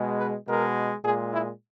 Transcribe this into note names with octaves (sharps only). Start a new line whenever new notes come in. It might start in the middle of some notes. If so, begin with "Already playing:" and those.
Already playing: B2 G#3
B4
B2 G#3 A#4
A#2 G#3 G#4
E4